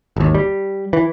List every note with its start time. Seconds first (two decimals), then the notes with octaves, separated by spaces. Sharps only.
0.16 G#1 D#2
0.35 G3
0.93 E3